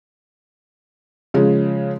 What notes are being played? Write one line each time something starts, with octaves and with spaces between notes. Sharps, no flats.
C#3 F3 G#3 C#4